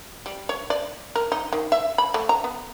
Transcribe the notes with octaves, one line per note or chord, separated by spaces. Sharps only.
G3
C#5
D5
A#4
D#4
D#3
E5
B5
A3
A#5
B3